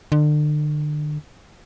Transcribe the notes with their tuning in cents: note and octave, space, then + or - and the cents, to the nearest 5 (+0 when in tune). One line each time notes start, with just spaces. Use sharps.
D3 +35